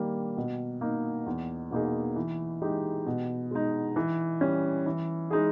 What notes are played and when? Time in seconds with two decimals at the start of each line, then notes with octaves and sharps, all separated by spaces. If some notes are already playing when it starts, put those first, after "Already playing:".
Already playing: D#3 G3 A#3
0.37 B2
0.81 A#3 D#4
1.26 E2
1.71 B2 A#3 D#4 G#4
2.16 E3
2.62 G#3 D#4 G4
3.06 B2
3.51 G#3 D#4
3.96 E3
4.41 G3 C#4
4.86 E3
5.31 G#3 D#4 G#4